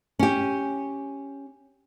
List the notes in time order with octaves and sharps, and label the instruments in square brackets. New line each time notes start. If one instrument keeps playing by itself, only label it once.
[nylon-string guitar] C#4 G4